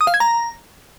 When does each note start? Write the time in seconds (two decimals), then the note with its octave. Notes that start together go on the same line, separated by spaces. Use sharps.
0.01 D#6
0.07 F5
0.14 G#6
0.20 A#5